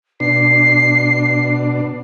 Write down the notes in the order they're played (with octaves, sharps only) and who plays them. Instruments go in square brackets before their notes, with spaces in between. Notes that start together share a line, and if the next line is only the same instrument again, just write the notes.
[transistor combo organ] B2 D4 [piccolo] C7